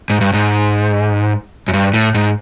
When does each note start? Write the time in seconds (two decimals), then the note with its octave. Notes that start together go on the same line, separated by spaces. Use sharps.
0.10 G#2
0.21 G2
0.33 G#2
1.68 F#2
1.73 G2
1.94 A2
2.14 G#2